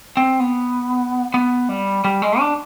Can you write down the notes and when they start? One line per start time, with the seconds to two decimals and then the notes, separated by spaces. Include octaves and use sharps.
0.17 C4
0.40 B3
1.34 B3
1.69 G3
2.05 G3
2.22 G#3
2.39 D4